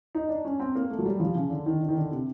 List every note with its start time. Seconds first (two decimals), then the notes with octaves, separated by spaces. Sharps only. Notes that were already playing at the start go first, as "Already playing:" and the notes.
0.15 D#4
0.29 D4
0.45 C#4
0.60 C4
0.75 A#3
0.90 A3
0.99 F#3
1.06 G3
1.20 F3
1.35 C#3
1.50 D3
1.66 D#3
1.80 D3
1.89 D#3
1.96 D3
2.11 C3